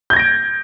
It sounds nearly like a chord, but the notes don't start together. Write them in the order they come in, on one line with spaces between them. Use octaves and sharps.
G6 G#6 A#6 D7